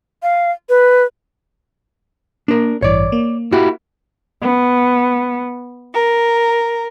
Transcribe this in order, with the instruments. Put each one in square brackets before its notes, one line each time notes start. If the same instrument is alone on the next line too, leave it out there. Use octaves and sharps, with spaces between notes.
[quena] F5
B4
[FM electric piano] A#3 [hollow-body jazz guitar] D4 A#4
[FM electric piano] A1 G2 E3 [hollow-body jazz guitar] C#5 D5
[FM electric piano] A#3
[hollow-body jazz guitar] E4 F#4 G4
[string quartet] B3
A#4